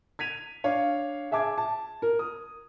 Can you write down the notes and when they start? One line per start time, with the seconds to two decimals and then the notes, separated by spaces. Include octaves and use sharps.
0.19 G#6 B6 D#7 F7
0.64 D4 C#5 F5
1.31 G#4 E5 A5 D6 G#6
1.58 A5
2.02 A#4
2.19 D#6